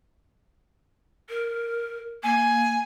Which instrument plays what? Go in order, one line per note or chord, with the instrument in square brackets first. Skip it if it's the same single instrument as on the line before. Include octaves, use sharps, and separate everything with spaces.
[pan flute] A#4
[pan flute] A#3 [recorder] G#5